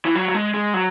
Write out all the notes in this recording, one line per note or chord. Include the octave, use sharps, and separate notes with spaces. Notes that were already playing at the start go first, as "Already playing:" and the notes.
E3
F#3
F#3
G#3
G#3
F#3